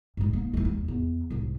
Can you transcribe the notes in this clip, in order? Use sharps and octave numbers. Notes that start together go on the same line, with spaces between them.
G2 G#3
G#2 A#3
E3 G#3
D#2
E2
C2 G#2